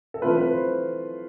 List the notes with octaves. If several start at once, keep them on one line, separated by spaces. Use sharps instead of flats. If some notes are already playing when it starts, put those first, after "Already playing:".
A4
E3 A3 C4 F4 B4
B4
C5